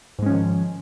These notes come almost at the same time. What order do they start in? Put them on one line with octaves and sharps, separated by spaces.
G#2 G#3 C#4 F3 D#3